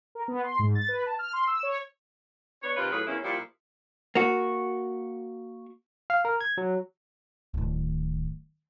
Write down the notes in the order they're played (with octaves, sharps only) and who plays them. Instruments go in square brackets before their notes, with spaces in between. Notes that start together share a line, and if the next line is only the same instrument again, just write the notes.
[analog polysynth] A#4
B3
C6
G#2
A6
B4
A5
F6
C6
E6
C#5
[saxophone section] B3 D4 C#5
C3 D#3 F4 B4
A2 F#3 F4 G#4 B4
E2 G2 A#3 C#4 E4
A#2 F3 G3 E4
[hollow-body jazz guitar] A#3 F#4
[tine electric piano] F5
A#4
G#6
F#3
[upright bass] D1 D#3